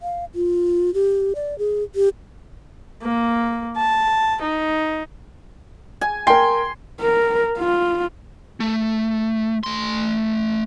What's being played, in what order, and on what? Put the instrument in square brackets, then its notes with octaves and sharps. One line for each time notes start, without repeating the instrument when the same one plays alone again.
[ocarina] F5
F4
G4
D5
G#4
G4
[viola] A#3
A5
D#4
[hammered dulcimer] G#5
[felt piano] A#4 G5 [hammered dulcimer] C6
[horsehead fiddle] A#4
F4
[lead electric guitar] A3
A3 C6